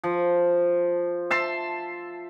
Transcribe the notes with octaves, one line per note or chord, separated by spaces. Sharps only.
F3
E5 A5 C6